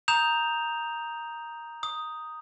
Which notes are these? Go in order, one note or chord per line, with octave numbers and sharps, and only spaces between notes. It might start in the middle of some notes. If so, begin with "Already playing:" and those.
A#5 D#6 G6 E7 F7
D#6